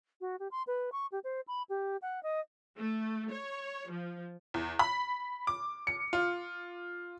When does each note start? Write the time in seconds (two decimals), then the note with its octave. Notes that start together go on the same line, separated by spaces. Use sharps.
0.21 F#4
0.40 G4
0.51 C6
0.67 B4
0.92 C#6
1.12 G4
1.24 C5
1.48 B5
1.69 G4
2.02 F#5
2.23 D#5
2.78 A3
3.32 C#5
3.90 F3
4.54 E2
4.79 B5
5.47 D6
5.87 C#7
6.13 F4